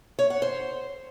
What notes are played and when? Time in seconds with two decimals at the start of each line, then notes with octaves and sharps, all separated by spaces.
0.19 C#5
0.30 F#5
0.42 C5